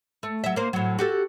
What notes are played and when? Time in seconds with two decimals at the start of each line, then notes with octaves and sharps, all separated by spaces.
0.23 A3
0.44 F#3 E5
0.56 A#3 C5
0.73 A2 F#3
0.99 F#4 G4 A4